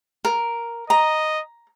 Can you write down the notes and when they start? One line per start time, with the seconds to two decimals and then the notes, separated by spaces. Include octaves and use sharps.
0.25 A#4
0.90 D#5 A#5